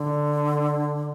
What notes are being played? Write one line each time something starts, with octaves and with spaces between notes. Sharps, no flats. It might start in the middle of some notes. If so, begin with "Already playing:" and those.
Already playing: D3